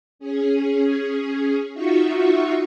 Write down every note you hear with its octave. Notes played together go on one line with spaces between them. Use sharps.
C#4 G#4
D#4 F4 F#4 E5 C#6